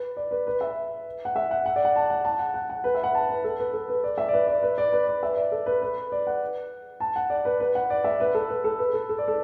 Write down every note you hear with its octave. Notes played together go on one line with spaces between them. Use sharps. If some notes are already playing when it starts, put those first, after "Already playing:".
Already playing: B4
D5
B4
B4
E5
F#5
E5
F#5
F#5
D5
F#5
A5
F#5
A5
F#5
F#5
F#5
B4
E5
F#5
A5
B4
A4
B4
A4
B4
D5
E5
D5
B4
D5
B4
D5
B4
D5
E5
D5
A4
B4
B4
D5
F#5
A5
F#5
D5
B4
B4
F#5
D5
E5
B4
A4
B4
A4
B4
A4
A4
D5
A4